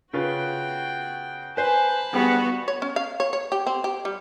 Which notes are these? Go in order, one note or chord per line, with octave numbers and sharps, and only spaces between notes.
C#3 F4 F#4 B4 G5
B4 C5 G#5 A5 B5
G2 G3 B3 F#4 G#4 G5
C#5
C#4
F5
C#5
C#5
G4
C4
G4
G3